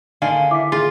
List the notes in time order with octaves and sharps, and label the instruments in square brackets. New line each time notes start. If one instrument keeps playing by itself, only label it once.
[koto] D3 D#3 G#4 [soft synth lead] F5
[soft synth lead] E4 [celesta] D6 B6
[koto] F4 [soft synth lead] G#4